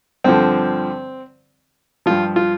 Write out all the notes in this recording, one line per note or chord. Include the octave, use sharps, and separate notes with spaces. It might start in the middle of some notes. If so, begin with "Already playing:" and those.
G2 D3 F3 C4
G2 F3 F4
F4